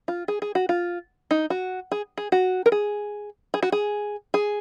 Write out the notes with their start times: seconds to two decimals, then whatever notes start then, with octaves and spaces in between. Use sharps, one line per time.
0.08 F4
0.28 G#4
0.42 G#4
0.55 F#4
0.69 F4
1.31 D#4
1.50 F#4
1.92 G#4
2.17 G#4
2.32 F#4
2.66 A#4
2.72 G#4
3.54 G#4
3.62 F#4
3.72 G#4
4.34 G#4